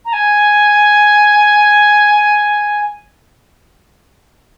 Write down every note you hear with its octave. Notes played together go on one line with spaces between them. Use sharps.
A#5
G#5